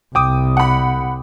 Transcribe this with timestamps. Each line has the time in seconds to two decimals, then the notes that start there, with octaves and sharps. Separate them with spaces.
0.15 C2 G5 D6 D#6
0.57 F#5 B5